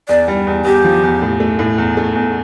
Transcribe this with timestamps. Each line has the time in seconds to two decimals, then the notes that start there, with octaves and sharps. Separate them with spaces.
0.08 E2 D5
0.28 G3
0.47 E2
0.65 E2 G4
0.84 F3
1.03 E2
1.22 A2
1.40 A3
1.59 A2
1.78 E2
1.97 A3
2.15 E2